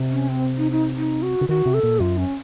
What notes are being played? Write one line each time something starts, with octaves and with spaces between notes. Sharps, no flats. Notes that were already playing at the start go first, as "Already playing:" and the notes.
Already playing: C3
C#4
C4
D#4
D#4
D#4
F#4
C#3
D#3 F#4
C3
A4
A#2
F#2 F4
C#4